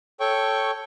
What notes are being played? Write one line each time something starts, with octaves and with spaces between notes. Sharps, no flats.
A4 C#5 G5 C#6